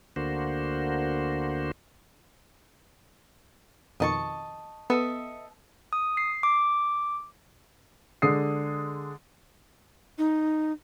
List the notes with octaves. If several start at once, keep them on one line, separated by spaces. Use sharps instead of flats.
D2 D3 A#3 F#4 C5
F2 B2 D#3 D#5 A5 C#6
B3 A4 D#5 E5
D#6
C7
D6
D3 G#3 D#6 C7
D#4